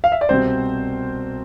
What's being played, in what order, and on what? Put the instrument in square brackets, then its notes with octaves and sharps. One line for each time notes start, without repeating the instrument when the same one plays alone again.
[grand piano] F5
E5
D5
C2 B2 C4 C5